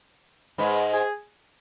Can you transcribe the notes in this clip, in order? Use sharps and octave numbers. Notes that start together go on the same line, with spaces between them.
G#2 G#3 B4
G#4